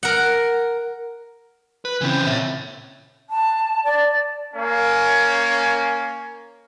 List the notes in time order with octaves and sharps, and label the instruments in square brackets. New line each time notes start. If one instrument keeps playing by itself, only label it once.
[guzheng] A#4 F#5
[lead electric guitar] B4
[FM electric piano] C#3 C#4 E4 [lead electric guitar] E3 C4
[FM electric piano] A#2 [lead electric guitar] C#5 E5
[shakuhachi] A5
D5
[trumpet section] A#3 C#4